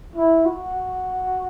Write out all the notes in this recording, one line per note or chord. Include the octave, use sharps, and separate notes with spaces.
E4
F#4